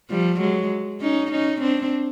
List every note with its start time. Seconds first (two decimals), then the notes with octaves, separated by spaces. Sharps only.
0.10 F3 G3
0.40 F#3 G#3
1.01 C#4 D#4
1.31 C#4 D#4
1.61 C4 D4